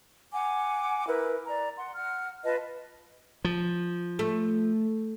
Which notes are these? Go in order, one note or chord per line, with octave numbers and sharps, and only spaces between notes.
F#5 G#5 D6
E4 A#4 B4
D5 A#5
F#5 C6
F#5 F6
F4 B4 D#5 A5
F3
A3